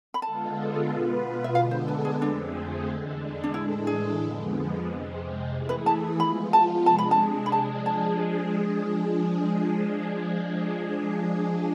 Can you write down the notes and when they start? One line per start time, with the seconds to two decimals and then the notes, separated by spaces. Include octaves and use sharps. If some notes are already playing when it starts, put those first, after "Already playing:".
0.14 B5
0.22 D3 G#3 B3 F4 A4 A5
0.89 B2 B3 F4 B4
1.44 E5
1.55 D3 G#3 B3 D4 A4 F5
1.71 C5
1.88 B4
2.05 G#4
2.21 F2 D3 A3 C4 D4 G#4
2.88 E2 D3 G#3 D4
3.44 D4
3.54 A2 E3 G#3 D4 E4 A4
3.87 G#4
4.20 F2 D3 F3 G#3 B3
4.87 F2 C3 G#3 C4
5.53 E3 A3 E4 G#4
5.69 B4
5.86 A5
6.19 F3 G#3 B3 F4 B5
6.53 A5
6.86 C3 G#3 D4 G#4 A5
6.98 B5
7.11 A5
7.46 B5
7.52 F3 G#3 D4 G#4 A5
7.86 A5